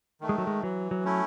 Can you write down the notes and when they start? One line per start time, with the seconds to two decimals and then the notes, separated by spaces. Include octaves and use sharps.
0.21 D#3 A3
0.29 G#3
0.38 F#3
0.47 G#3
0.63 E3 F#3
0.91 F#3
1.05 A3 C#4 E4